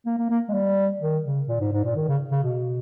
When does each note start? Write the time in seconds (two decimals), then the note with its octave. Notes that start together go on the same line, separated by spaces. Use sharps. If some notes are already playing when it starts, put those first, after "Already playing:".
0.06 A#3
0.18 A#3
0.30 A#3
0.49 G#3
0.53 G3
1.01 D#3
1.24 C#3
1.48 A#2
1.60 G#2
1.72 G#2
1.85 A#2
1.96 D#3
2.08 C#3
2.31 C#3
2.43 B2